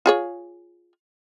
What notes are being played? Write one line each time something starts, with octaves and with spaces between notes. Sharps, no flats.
F4 G#4 C#5